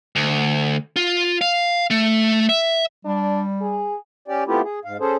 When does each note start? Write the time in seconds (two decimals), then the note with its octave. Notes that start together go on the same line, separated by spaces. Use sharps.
0.16 D2
0.96 F4
1.41 F5
1.90 A3
2.49 E5
3.05 G3 D4
3.61 G#4
4.28 C#4 G4 D5
4.47 A3 B3 C4 E4 F4 G4
4.64 G#4
4.85 G#2 F5
5.00 C#4 G#4 A4 C5